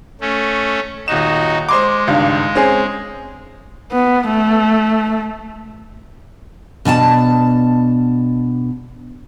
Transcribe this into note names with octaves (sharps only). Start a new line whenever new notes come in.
A3 C#4
D#1 D#4 F#4 E7
G#3 C5 C6 D6
G#1 C#2 G2
C4 C#4 G#4
B3
A3
B2 D4 G#5 A5